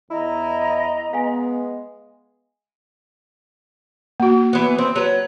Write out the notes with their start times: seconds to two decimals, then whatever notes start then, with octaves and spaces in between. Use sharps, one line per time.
0.11 E2 E4 D#5 A#5
1.13 G#3 B3 F5 G#5
4.20 A#3 F#4
4.53 E3 B3
4.78 C4
4.96 F#3 B4